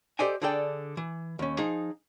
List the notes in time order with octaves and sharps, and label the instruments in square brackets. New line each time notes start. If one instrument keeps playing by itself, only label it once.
[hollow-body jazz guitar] G4 A4 C5 D5 D#5 G#5
D3 D4 G#4 A4 D5 G5
E3
D#2 C#4
F3 D#4 G#4